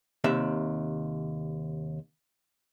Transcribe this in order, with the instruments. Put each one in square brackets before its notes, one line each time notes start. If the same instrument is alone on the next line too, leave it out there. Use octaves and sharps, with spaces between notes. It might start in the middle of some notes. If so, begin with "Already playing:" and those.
[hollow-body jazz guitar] D#2 C3 E5